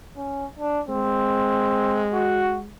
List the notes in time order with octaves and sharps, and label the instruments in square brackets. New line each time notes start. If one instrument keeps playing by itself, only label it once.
[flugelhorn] C#4
D4
[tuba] G#3 [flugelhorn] C4
[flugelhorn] F#4